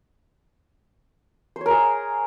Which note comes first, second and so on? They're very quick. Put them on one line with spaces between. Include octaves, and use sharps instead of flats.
C5 C#5 A#4 G#4